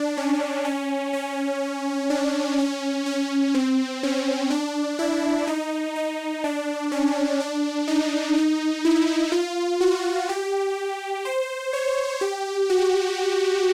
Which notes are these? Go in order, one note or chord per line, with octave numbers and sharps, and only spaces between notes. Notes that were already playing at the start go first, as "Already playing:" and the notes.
Already playing: D4
C#4
C#4
C#4
D4
C#4
C#4
C4
C#4
D4
E4
D#4
D#4
D4
C#4
D4
D#4
D#4
E4
F4
F#4
G4
C5
C#5
G4
F#4